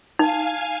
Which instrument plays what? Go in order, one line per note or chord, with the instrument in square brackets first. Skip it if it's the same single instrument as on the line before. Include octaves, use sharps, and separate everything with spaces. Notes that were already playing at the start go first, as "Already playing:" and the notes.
[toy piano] D#4 [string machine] F5 G#5